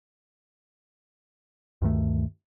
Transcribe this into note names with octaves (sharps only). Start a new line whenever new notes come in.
D2 G2 D#3 A3